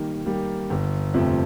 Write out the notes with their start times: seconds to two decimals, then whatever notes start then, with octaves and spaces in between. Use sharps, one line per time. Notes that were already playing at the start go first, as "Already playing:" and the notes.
Already playing: D#3 G3 A#3
0.26 G3 A#3
0.70 G1
1.14 F2 C3 F3 A3